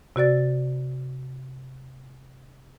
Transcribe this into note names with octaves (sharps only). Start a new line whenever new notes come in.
C3 F#4 D5 A6